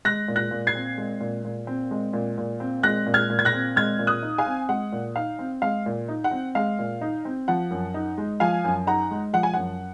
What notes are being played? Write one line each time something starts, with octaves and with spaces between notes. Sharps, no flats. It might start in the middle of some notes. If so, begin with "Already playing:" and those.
G#3 F#6 A#6
A#2
F#6 A#6
A#2
G#6 C7
C4
G#3
A#2
A#2
C4
G#3
A#2
A#2
C4
G#3 F#6 A#6
A#2
F6 G#6
A#2
G#6
F#6 A#6
C4
G#3 F6 G#6
A#2
D#6 F#6
D#4
F5 G#5
C4
G#3 F#5
A#2
D#4 F5
C4
G#3 F5
A#2
D#4
F#5
C4
G#3 F5
A#2
D#4
C4
F3 F#5
F#2
D#4
G#3
F3 F5 G#5
F#2
D#4 F#5 A#5
G#3
F3 F#5
G#5
F#2 F#5